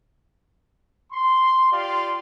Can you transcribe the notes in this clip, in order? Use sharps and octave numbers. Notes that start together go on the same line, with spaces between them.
C6
F4 G4 D5 F5 C6